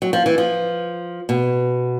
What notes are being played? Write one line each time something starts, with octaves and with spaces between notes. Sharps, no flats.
F#3
F3
E3
F3
B2